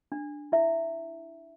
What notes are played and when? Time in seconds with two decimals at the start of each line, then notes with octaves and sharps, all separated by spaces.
0.12 D4
0.52 E4 E5